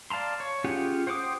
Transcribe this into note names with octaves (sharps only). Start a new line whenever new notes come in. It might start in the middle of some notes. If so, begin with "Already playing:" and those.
D5 F5 A5 A#5 C6
C#5
C#4 F4 G4 G#4 F#5
C5 F#5 G5 D6 D#6